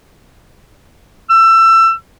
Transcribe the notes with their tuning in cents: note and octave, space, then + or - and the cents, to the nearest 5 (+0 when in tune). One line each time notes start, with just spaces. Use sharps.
E6 +25